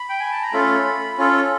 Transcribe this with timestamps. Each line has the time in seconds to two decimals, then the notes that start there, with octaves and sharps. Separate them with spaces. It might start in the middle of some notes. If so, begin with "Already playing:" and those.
Already playing: B5
0.09 G5
0.20 G#5
0.32 A5
0.42 A#5
0.53 A3 C#4 F4 A4 B5
1.18 C#4 F4 A4